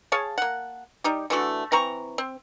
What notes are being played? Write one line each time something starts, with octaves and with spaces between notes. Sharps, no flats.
G#4 C#5 F5 A5
A#3 F#5
G3 D#4 G4
D3 E3 A3 F#4
E3 C4 A#5 C#6
C4